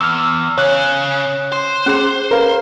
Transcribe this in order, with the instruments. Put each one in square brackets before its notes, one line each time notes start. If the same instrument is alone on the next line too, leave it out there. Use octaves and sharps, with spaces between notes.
[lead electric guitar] E2 [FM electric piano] E6 F6
[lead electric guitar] C#3 [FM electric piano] C#5 F#6
[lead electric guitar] C5
[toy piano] C#4 G#4 C6
[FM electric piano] A#4 B4 F5